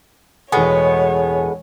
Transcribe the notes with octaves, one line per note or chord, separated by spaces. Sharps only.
E1 A2 G#3 B3 C#5 G#5